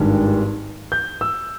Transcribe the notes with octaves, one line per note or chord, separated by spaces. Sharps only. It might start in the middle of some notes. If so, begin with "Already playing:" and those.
Already playing: G#1 G2 D#3 G#3
G6
E6